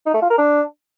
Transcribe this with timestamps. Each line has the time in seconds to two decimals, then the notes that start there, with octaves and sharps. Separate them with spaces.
0.06 D#4
0.14 A3
0.22 F4
0.30 A#4
0.38 D4